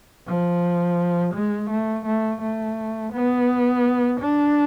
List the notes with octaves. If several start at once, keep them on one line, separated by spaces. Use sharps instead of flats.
F3
G#3
A3
A3
A3
B3
D4